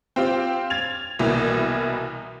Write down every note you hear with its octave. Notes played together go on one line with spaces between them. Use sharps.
C4 F4 G4
G#6 A6 F7
C2 B2 E3 A#3